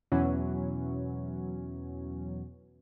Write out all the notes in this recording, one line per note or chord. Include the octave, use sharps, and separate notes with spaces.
E2 B2 E3 F#3 C#4